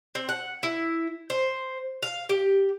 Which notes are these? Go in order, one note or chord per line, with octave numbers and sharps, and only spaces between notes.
C4
F#5
E4
C5
F5
G4